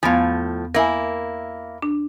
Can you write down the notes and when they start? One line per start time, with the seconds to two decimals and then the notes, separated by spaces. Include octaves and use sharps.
0.03 E2 A2 F3 B3 F5
0.75 A#3 E4 A#4 G#5
1.82 D4